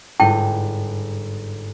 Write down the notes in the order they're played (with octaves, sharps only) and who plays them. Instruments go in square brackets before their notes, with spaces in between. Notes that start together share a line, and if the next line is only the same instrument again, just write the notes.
[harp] G1 G#2 G6 [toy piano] E4 G5 A5